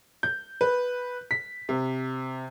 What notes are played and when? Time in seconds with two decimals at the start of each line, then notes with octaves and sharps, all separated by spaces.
0.23 G6
0.61 B4
1.31 B6
1.69 C3